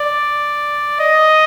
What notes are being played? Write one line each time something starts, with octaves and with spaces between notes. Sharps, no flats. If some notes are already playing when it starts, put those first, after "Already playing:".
Already playing: D5
D#5